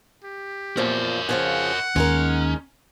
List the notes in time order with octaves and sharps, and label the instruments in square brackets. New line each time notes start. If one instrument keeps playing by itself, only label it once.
[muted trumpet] G4
[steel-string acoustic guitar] E2 A#2 F3 [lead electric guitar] A#4 C#5
[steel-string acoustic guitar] C#3 F3 G#4 [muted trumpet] F#5
[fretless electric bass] D#2 [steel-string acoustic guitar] G#3 D#4 A#4 [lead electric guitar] C#4